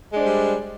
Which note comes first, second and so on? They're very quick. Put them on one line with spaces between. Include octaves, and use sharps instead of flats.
G#3 D4 C5 G3